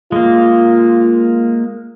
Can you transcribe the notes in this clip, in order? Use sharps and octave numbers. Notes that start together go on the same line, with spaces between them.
G#3 A#3 F4